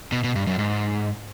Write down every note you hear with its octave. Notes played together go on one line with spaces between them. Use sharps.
B2
B2
G2
F#2
G#2